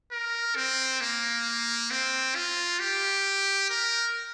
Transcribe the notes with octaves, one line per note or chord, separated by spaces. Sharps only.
A#4
C4
A#3
C4
F4
G4
A#4